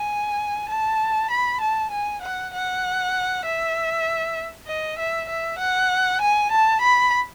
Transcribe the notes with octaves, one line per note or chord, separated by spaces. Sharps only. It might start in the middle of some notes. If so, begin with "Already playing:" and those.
Already playing: G#5
A5
B5
A5
G#5
F#5
F#5
E5
D#5
E5
E5
F#5
G#5
A5
B5